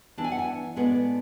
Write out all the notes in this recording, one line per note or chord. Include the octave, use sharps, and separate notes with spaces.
E3 B3 D4 A5
G#5
F#5
G#5
A2 G#3 B3 D4